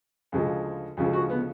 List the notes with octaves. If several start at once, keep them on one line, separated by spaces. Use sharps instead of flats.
D2 C#3 F3 G#3
D2 C#3 F3 G#3
F#4
B3